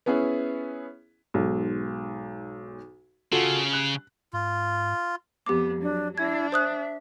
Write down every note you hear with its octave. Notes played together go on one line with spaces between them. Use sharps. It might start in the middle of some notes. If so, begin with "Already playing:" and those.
B3 C#4 E4 G#4
B1 G#2
C#3 F4 F#4 A4
F#6
G#2 F4
F2 B3 G4 D6
F#3 D4
D4 E4 G#6
C5 E5 D#6 F#6